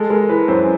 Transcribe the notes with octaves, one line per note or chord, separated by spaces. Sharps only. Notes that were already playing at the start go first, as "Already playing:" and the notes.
Already playing: G#3 A4
G#3 A#4
E3 B4
F#2 C5